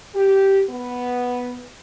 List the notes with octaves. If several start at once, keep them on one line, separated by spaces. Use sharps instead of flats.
G4
B3